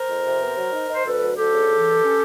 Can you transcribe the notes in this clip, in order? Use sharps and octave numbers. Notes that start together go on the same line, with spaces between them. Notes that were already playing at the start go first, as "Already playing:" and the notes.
Already playing: A#4 C5
F2
C3
B3
F#3
D#4
D#4 C5
D2 A4 B4
F#3
D2 G4 A4
C#3
E3
G2
C#4